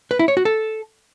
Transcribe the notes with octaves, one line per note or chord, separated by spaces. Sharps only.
B4
E4
C#5
F#4
A4